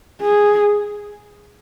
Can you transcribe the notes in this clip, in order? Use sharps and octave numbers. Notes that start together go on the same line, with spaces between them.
G#4